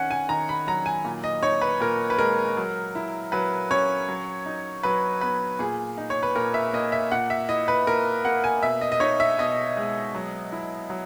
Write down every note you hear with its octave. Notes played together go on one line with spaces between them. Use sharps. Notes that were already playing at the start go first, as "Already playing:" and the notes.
Already playing: D#3 C#4 F#5 G#5
G#5
D#3 A#5
B5
F#3 A#5
G#5
A#2
D#5
D#4 C#5
B4
A#2 A#4
B4
G#3 A#4
F#3
E4
F#3 B4
C#4 C#5
F#3
D#4
F#3 B4
B3 B4
A#2 G#4
D#4
C#5
B4
A#2 A#4
E5
A#3 D#5
E5
A#2 F#5
E5
E4 D#5
B4
A#2 A#4
A#3 F#5
G#5
B2 E5
D#5
D#5
D#4 C#5
E5
B2 D#5
G#3
F#3
E4
F#3